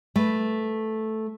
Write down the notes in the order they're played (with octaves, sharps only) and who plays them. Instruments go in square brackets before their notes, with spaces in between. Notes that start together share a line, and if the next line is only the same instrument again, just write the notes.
[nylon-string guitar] A3 B4